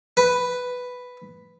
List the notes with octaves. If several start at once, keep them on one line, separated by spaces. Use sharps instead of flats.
B4